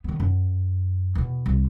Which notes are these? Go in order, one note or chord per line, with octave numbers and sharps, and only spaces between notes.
D#3 B3
F#2
E2 B2
C2